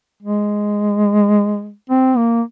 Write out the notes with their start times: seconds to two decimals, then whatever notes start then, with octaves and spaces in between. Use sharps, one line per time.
0.23 G#3
1.90 C4
2.17 A#3